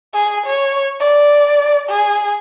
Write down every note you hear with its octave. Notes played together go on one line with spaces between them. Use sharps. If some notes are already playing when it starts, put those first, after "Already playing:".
G#4
C#5
D5
G#4